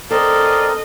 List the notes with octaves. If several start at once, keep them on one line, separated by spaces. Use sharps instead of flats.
C4 A4 A#4 D5 D#5 F5